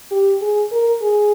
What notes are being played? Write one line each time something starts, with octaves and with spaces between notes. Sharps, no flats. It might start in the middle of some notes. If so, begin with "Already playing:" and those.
G4
G#4
A#4
G#4